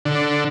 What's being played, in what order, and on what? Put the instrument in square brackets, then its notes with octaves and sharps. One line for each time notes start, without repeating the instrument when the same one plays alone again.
[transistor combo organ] D3